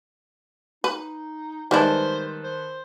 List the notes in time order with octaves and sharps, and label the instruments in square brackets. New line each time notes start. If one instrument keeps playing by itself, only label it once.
[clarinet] D#4 [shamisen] B4
[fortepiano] D#3 B4 A5 [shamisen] G3 G#3 E4 [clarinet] C5
[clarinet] C5